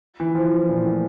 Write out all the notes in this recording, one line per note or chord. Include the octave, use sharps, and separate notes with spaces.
E3
F3
E3
A#2
A2